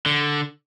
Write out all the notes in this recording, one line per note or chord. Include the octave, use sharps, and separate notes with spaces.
D3